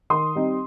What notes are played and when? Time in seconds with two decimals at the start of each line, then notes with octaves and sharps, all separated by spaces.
0.10 D#3 C6 D#6
0.35 G3 C4 D#4